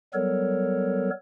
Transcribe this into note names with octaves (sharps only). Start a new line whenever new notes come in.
F#3 G3 B3 A4 A#4 C#5